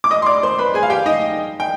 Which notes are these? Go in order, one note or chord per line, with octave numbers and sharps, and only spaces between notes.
D6
D#5 D#6
C6
D5 D6
C5 C6
B4 B5
G#4 G#5
F5
G4 G5
D#4 D#5
G5